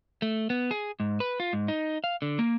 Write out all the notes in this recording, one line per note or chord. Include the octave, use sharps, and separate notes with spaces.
A3
B3
G#4
G#2
B4
F4
G#2
D#4
F5
D3
A#3